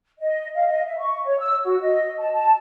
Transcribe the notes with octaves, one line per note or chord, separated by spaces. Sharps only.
D#5
F5
D#5
E5
C#6
C#5
E6
F#4
D#5
A5
A5